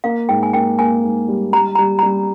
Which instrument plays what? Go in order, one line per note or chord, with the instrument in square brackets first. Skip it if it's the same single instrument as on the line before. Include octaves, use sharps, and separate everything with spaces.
[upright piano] A#3 [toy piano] F5
[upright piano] G#2 [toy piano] G5
[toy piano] G#5
[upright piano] A#3 [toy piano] G5
[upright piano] A#3 [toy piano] G#5
[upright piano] G#2
G3
[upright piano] G3 [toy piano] A#5
[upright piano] G3 [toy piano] A#5
[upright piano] G3 [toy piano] A#5